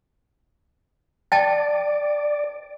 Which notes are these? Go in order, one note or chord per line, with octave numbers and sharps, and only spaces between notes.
D5 G5 A5